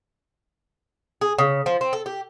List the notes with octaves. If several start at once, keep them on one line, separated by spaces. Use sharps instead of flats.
G#4
C#3
F3
C4
A4
G4